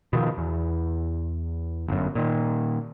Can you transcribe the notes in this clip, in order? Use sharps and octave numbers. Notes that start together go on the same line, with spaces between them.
B2 D#3 F3
E2
G1 F#2
A#2 D#3